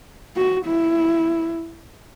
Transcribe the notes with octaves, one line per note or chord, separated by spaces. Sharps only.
F#4
E4